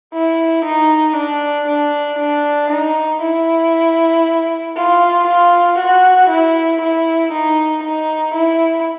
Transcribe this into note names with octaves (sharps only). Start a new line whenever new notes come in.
E4
D#4
D4
D4
D4
D#4
E4
F4
F4
F#4
E4
E4
D#4
D#4
E4